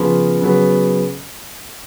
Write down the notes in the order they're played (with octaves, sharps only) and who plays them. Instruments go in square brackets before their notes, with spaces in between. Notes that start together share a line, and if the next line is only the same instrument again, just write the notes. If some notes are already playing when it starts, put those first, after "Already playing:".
Already playing: [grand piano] C#3 F3 B3
C#3 F#3 B3